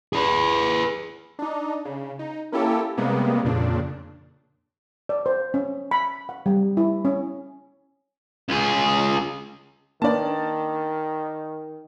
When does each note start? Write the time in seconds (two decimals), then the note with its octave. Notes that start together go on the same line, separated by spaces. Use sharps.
0.13 G#4 B4
1.39 D4 D#4
1.85 C#3
2.19 D#4
2.52 A#3 C#4 E4 G4 A4
2.97 C3 G3 G#3 A#3 B3
3.45 F2 A#2 C#3 D4
5.09 D5
5.26 C5
5.54 C#4
5.91 B5
6.29 F#5
6.46 G3
6.77 E4
7.05 C#4
8.49 C#2 G#4
10.02 D#3 A#3 D4 B4 D5 A5